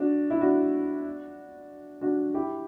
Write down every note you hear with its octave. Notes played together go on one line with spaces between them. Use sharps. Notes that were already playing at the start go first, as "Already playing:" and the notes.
Already playing: D4 F#4
E4
D4 F#4
D4 F#4
E4 G4